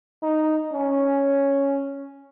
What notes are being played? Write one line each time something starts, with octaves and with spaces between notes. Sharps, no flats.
D#4
C#4